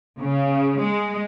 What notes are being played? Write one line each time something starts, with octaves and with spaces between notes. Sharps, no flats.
C#3
G#3